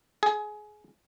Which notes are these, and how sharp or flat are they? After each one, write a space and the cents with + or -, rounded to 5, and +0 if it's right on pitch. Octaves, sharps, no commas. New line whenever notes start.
G#4 +20